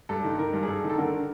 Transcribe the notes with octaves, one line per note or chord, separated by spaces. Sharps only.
G2 A4
D#3
D#3 A#4
G2
G#4
G2 A4
D#3
A4
D3 A#4